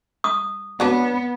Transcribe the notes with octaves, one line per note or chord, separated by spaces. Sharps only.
D#6
F#3 B3 D4 B4